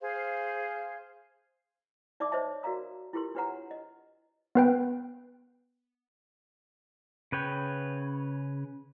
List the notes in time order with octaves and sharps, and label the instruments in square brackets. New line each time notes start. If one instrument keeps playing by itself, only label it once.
[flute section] G#4 C5 F5
[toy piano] D#4 D5 E5 A5 D6 D#6
C5 C#5 D#5 E5 A5
F#4 A#4 D5 F5 A#5 D#6
E4 F4 G4 A4 A#4 C6
D4 G4 B4 C#5 F#5 A#5
D#5
[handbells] B3 B4 G5
[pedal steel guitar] C#3 B4 C#5 G5